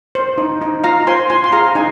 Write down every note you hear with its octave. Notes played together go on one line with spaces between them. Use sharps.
C5
D#4
D#4
F4 F5 A#5
C5 G#5 C6
F4 G#5 C6
C6
G#4 F5 A#5
D#4 G#5